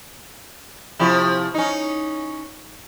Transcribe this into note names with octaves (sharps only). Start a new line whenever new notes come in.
C3 F3 E4
C#4 D#4